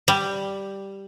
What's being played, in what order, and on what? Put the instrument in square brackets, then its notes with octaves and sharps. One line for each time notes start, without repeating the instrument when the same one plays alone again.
[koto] G3